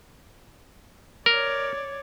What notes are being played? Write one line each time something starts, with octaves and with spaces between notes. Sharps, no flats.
A#4 C#5 D5